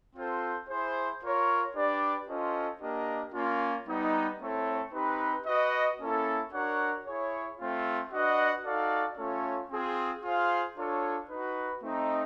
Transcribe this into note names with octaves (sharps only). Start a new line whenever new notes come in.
C4 F4 A4 C5
E4 G#4 C5
F4 A#4 C#5
D4 G4 B4 D5
C#4 F4 A4 C5 D#5
A#3 D4 G4 A#4 D#5
A#3 C#4 F4
G3 B3 D#4
A3 C4 E4 A4 C#5
C4 D#4 G4 B4
F#4 B4 D#5
A#3 C#4 E4 A4
D4 F#4 A#4 C#5 F#5
E4 G#4 C#5
A3 C4 F4
D4 F#4 B4 D#5 F#5
D#4 F#4 A4 D5 F5
A3 C#4 F4 A4 C#5
C4 F4 G#4
F4 G#4 C5 F5
D4 F4 A4 C#5
D#4 F#4 B4
A3 C4 D#4